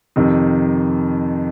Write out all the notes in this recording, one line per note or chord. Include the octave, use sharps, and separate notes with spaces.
F2 C3 D#3